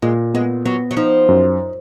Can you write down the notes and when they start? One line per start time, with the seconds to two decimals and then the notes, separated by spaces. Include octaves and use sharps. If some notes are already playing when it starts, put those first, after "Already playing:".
0.02 A#2 G#3
0.34 G#3 B3
0.65 F#3 B3
0.91 F#3
0.97 F3 D#4
1.29 F#2